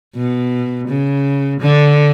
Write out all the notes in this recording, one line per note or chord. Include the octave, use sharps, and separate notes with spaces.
B2
C#3
D3